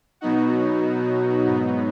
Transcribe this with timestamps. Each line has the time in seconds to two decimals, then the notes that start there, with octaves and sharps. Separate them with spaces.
0.21 B2 F#3 B3 D#4 F#4
1.47 G#2 F#3 B3 D#4